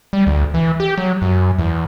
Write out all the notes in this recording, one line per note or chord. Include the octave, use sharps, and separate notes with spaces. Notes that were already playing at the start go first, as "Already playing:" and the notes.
G3
D2
E3
G4
F#3
F#2
E2